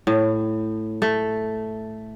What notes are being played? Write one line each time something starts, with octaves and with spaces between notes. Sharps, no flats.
A2
A3